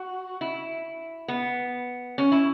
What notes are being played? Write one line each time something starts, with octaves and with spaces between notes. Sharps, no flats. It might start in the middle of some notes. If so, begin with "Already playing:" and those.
Already playing: F#4
E4
B3
C#4
E4